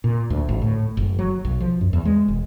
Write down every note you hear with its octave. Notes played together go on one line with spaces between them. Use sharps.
A#2
D2
G#1
A2
F#1
F#3
B1
F3
F#2
E2
G#3
E1